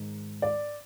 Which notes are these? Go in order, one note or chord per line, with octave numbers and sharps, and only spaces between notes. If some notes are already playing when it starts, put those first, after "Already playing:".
Already playing: G#2 D#3 G#3 D#4
D5